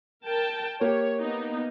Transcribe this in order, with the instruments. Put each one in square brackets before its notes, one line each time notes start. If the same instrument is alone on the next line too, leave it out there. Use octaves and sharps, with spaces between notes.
[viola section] A#4 G5 A5
[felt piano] A#3 G4 [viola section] C#5
[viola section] B3 D#4